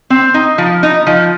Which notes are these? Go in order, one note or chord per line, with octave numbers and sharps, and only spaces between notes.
C4
D#4
F3
D#4
F3